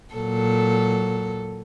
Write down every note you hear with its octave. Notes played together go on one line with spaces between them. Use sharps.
A#2 F#3 A4